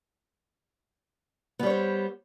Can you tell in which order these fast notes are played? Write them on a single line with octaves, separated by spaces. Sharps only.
B3 G3 C#5 C5